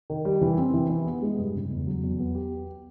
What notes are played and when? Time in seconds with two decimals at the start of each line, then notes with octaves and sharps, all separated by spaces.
0.10 D#3
0.25 G3
0.41 E3
0.58 C4
0.74 E3
0.90 E3
1.07 B3
1.22 G#3
1.38 G2
1.54 C#3
1.71 E2
1.87 F#3
2.03 E2
2.20 B3
2.35 G4